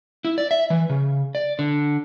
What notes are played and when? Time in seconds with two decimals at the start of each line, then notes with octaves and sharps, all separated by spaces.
0.25 E4
0.38 D5
0.51 E5
0.70 E3
0.90 C#3
1.35 D5
1.59 D3